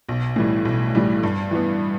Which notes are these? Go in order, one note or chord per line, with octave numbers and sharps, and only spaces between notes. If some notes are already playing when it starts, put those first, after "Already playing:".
B1
A2 E3 G3
B1
A2 E3 G3
G2
E3 B3